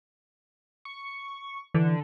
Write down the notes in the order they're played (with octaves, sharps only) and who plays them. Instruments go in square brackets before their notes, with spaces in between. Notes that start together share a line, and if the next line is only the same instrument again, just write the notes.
[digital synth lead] C#6
[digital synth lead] D3 [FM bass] E3